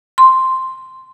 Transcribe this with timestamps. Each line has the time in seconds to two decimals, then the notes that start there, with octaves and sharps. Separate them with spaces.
0.18 C6